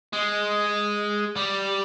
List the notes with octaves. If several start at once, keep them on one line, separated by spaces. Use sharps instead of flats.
G#3
G3